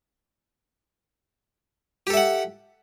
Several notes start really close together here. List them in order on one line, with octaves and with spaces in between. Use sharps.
G4 A4 E5 F#5